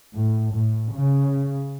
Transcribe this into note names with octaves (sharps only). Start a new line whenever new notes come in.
A2
A2
C#3